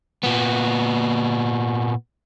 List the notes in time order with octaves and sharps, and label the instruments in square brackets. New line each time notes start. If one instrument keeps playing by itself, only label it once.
[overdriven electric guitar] A#2 B3